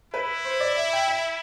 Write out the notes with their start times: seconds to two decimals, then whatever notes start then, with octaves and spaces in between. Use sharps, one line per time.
0.13 E4 B4
0.45 C5
0.60 D5
0.76 E5
0.93 G5
1.08 E5